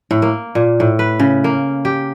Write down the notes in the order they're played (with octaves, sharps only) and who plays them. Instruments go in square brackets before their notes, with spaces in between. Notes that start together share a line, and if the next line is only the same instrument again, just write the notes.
[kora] A2
A#3
A#2
A2
B4
C#3
A#3
G4